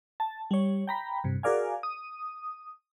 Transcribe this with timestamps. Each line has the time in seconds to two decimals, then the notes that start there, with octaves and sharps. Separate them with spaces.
0.20 A5
0.51 G3 C#5
0.88 G5 A#5 B5
1.24 G2 C3
1.43 F#4 G#4 A#4 D5 F5 G#5
1.83 D#6